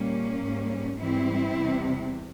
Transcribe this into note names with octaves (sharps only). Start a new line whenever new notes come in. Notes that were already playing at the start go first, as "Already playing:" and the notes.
Already playing: A#2 G3 A#3 C#4
G#2 G3
G#2 E3 G3 C4 E4
E2 C3 G3